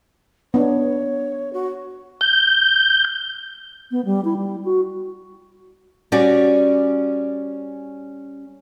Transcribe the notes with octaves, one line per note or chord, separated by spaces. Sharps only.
B3 D4 C#5
F#4
G6
B3
G3
E4
G3
F#4
G3 C#4 F#4 D5